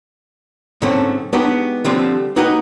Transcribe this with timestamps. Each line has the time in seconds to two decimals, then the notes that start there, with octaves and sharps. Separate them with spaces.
0.82 G#2 D3 F#3 A3 C4 C#4
1.33 G#3 B3 D4 D#4 F#4 G4
1.85 D3 F3 G3 A3 C4 D4
2.36 A#3 D#4 F#4 G4 B4 D#5